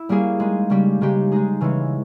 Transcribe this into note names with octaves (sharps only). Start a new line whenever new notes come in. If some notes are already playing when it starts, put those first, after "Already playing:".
Already playing: E4
G3 A#3 C#4 G#4
G#3 D#4 G#4
C#3 G3 C#4 G4
C#3 G#3 D#4 G4
G#3 D#4 G#4
C#3 E3 G#3 C#4